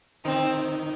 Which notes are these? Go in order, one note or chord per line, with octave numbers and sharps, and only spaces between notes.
D#3 C4 D#4